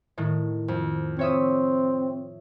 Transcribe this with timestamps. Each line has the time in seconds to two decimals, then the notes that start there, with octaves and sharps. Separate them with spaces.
0.18 A2 D#3
0.68 F2
1.19 C4 C#5 E5 D#6